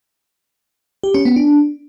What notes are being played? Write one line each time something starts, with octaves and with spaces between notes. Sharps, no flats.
G4
C#4
B3
D4